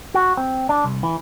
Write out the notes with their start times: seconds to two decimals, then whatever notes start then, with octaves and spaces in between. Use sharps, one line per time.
0.14 F#4
0.37 C4
0.69 D4
0.84 C2
1.03 E3